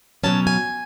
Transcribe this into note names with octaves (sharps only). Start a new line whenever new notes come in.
B2 F#3 C#4 A5
G#5